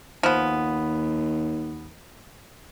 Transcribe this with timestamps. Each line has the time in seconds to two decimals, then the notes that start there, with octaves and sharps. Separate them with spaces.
0.23 D#2 F3 B3